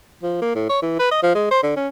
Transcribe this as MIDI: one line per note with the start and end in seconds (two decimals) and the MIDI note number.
0.23 0.39 53
0.42 0.54 58
0.55 0.66 45
0.69 0.80 73
0.82 0.96 52
0.99 1.08 71
1.11 1.22 75
1.23 1.33 53
1.35 1.49 56
1.51 1.61 72
1.63 1.72 50
1.76 1.87 61